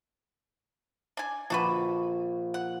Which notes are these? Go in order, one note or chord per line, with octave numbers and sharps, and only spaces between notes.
D4 G#5
A#1 D4 F#4 B4
F#5